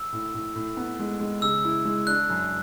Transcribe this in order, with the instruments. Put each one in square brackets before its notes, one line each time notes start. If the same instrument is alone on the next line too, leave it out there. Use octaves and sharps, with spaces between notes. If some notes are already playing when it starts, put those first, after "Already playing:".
Already playing: [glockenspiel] E6
[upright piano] A2
A2
A2
B3
G#3
G#3
[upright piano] C#3 [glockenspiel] E6
[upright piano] E4
G#3
[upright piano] D4 [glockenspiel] F#6
[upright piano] F#2